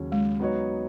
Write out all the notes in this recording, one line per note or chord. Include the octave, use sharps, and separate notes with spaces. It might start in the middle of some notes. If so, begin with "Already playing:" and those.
Already playing: D#2 C#3 F#3 C#4
G#3
F#3 B3 D#4 F#4 C#5